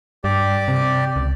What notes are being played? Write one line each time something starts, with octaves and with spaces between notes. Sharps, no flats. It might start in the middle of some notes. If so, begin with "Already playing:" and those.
G2 G4 D5
C3
C#2